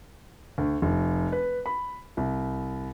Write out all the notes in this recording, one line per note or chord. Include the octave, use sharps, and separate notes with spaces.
D2
F1
B4
B5
C2